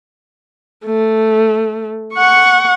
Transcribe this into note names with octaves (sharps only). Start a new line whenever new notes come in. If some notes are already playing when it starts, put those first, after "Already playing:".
A3
F#5 C#6